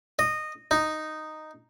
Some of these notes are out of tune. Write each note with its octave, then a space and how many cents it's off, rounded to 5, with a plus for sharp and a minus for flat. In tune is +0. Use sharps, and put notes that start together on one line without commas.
D#5 -15
D#4 -5